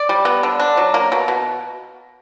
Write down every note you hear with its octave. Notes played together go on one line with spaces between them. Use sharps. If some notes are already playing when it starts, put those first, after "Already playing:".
Already playing: D5
G3
B3
D3
D4
F#3
A#3
B2
B2